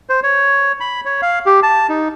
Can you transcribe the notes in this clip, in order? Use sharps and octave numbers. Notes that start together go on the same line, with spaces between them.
C5
C#5
B5
C#5
F5
G4
A5
D#4